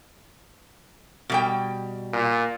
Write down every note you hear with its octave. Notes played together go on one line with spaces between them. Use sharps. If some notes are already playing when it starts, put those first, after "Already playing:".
B2 G3 G5
A#2